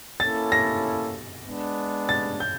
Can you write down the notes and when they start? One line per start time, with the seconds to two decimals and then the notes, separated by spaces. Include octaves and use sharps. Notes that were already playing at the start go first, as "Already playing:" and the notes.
0.20 A#3 C#4 E4 A4 A6
0.52 A#6
1.45 G#3 B3 D4
2.09 A6
2.40 G6